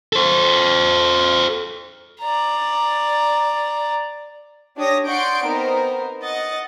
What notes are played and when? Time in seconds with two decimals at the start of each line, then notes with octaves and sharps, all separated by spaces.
0.13 A4 C5
2.21 D5 A#5
4.77 D4 G4 C#5 D#6 A#6
5.07 D5 F#5 C6 C#6 G6 D7
5.45 B3 C4 D#4 A#4 C5
6.23 D#5 F#5 A6